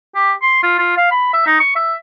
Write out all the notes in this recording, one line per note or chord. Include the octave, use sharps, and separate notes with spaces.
G4
C6
F4
F4
F5
B5
E5
D#4
C#6
E5